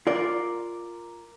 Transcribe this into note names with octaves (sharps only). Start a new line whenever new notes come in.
F4 A#4 D5